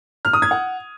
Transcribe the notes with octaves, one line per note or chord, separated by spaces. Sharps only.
F6
D#6
G#6
F#5